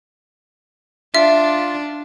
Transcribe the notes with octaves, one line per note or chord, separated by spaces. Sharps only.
D4 F4 E5